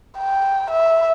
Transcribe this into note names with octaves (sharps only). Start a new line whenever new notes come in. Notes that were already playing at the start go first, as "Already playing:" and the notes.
G5
E5